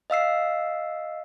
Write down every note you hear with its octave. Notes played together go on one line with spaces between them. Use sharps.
D#5 F5 E6 C7